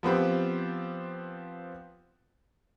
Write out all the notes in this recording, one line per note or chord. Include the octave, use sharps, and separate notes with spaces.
F3 B3 C4 G4